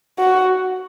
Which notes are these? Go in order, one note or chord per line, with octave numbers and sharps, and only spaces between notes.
F#4